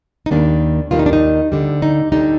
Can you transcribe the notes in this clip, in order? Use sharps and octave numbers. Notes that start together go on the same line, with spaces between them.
D#4
D#2 D#3 G3 A#3 D4
D#2 D#3 G3 A#3 F4
D#4
D4
D#4
D2 D3 G3
D#4
D2 D3 G3 D#4